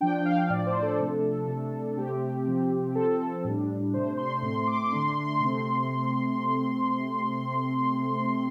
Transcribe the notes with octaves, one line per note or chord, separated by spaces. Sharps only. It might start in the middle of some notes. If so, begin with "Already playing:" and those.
F3 D4 G5
G5
F5
A2 F3 D4 D5
C5
A4
C3 F3 A3 D4
C3 A3 D4
C3 A3 C4 G4
C3 F3 C4
F3 C4 A4
A2 G3 D4
C3 A3 D4 C5
C6
A2 A3 C4 C6
D6
D6
D3 A3 D4 C6
C6
C6
C3 A3 C4